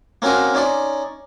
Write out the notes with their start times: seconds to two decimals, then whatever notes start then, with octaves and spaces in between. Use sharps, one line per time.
0.22 A#3 C4 C#4 F#4 A#4
0.55 C#4 D#4 D5 C6